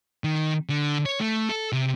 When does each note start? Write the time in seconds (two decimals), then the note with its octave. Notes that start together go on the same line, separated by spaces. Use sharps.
0.24 D#3
0.69 D3
1.06 C#5
1.20 A3
1.49 A4
1.72 C3